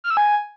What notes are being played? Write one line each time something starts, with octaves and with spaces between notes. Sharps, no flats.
F6
E6
G#5